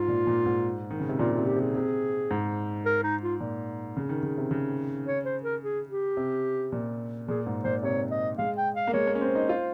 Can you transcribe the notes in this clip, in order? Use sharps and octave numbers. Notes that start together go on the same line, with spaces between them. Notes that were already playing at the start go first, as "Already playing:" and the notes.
Already playing: G#2 F4
A#2
A#2
G#2
D#3
C#3
C3
A#2 F4
C3 F4
G4
C3
G#4
C3
G#2
A#4
D#4
F4
A#2
C#3
D#3
C#3
C3
C#3
C#5
C5
A#4
G#4
G4
C3
A#2
A#2 G#4
G#2
A#2 C5
C3 C#5
D#5
G#3 F5
G5
F5
A#3
G#3 C#5
A#3
C#4
C4 C5
D#4
F4